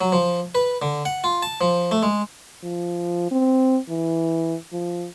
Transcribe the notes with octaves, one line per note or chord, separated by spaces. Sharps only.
F#3
F3
B4
D3
F#5
F4
A5
F3
A3
G#3
F3
C4
E3
F3